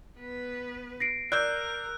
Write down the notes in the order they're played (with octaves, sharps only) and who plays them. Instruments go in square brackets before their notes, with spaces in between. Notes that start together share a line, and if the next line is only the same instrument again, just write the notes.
[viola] B3 B4
[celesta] A#6 C7 D7
[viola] A#4 [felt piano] D5 E6 G6 [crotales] F#6